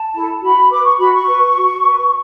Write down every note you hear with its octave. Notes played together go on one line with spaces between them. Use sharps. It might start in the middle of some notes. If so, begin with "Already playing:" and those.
Already playing: A5
E4 A4
F#4 B5
B4 D6
C#6
F#4 B5
C#6
B4
F#4
B4